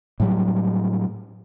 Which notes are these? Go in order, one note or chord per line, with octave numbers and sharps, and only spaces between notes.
A2 F#3 G3